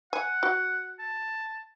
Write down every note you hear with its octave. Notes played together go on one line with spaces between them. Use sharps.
F#5 G#5
F#4
A5